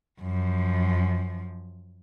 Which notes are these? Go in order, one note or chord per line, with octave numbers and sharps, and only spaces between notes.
F#2 F3